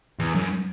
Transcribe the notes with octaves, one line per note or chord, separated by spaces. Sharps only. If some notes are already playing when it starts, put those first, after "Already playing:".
E2
F#2